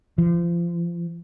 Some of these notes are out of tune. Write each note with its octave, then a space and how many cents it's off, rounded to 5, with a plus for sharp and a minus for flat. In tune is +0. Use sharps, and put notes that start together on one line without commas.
F3 -30